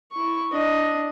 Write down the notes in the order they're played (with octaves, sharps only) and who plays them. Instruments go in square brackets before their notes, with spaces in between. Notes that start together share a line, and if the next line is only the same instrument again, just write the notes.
[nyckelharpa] E4 C#6
D4 D#5